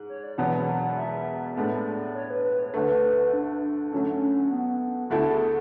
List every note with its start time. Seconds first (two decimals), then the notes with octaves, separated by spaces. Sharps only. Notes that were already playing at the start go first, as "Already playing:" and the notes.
Already playing: G#2
0.09 C#5
0.23 D5
0.38 E1 E2 B2 F#3 B3 F#5
0.97 E5
1.56 A2 G#3 B3 D4 A4 D5
2.15 C#5
2.30 B4
2.44 B4
2.59 C#5
2.74 D2 D3 A3 B4
3.04 B4
3.33 D4
3.92 D3 F#3 A3 C#4
4.03 D4
4.15 C#4
4.52 B3
5.10 D2 D3 A3 E4 F#4 A4
5.30 G#4